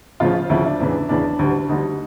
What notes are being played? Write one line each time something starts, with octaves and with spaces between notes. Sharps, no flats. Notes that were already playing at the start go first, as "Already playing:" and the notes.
D2 C#3 F3 F4
D2 C#3 F3 E4
D4
E2 C#3 E3
E2 C#3 E3 D4
D2 D3 G3
D2 D3 G3 D#4